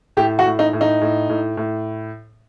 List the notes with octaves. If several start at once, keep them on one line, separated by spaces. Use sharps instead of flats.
A2 G4
F#4
A2
D#4
A2
D#4
A2
A2
A2